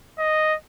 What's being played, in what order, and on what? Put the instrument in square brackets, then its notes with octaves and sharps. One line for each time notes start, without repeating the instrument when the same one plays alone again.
[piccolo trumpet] D#5